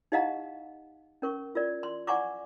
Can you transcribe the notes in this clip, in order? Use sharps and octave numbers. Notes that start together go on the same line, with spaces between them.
D#4 G4 D#5 F5 F#5 A#5
C#4 A#4 C#6
F4 A#4 D5
C6
D5 F#5 G#5 A#5 C#6 D6